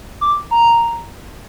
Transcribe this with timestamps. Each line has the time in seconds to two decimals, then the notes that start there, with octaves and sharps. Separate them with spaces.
0.21 D6
0.51 A#5